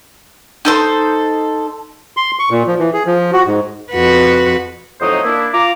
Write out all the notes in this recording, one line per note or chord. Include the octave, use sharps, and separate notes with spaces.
D#4 A4 C5
C6
C#6
A#2
F3
E3
G#4
F3
F#4
G#2
F2 F#4 B4
F2 A2 F#3 D#4 C5 D#5
A#3 D4 E4
F4 A#5 D6